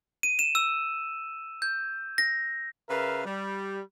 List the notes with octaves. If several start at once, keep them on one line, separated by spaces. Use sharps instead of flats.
D#7
E7
E6
G6
A#6
C#3 A#4 B4 E5 F5
G3